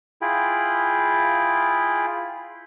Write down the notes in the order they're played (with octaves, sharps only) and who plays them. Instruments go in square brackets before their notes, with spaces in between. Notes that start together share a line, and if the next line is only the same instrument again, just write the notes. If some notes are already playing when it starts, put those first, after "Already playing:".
[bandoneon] E4 F4 G#4 G5 B5